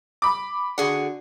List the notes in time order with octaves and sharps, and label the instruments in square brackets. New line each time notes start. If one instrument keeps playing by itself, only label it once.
[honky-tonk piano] B5 D6
[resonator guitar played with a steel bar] D3 G#4 F#5 [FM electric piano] D4 F#4